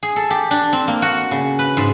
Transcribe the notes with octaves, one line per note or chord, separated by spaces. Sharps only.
G#4
A4
G4
D4
C4
A#3
F#4
C#3
B4
G#2